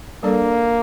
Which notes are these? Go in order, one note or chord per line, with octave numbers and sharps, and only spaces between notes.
G3 A#3 D4 A4 D5